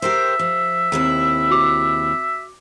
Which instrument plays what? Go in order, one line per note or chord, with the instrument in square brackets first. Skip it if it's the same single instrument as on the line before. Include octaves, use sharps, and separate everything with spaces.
[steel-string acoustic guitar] G4 A#4 C5 [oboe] E5
[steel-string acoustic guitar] F3
D#2 C3 E4
[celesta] F#4 D6